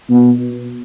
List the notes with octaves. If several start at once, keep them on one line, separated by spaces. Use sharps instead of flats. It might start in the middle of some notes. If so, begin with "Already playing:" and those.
B2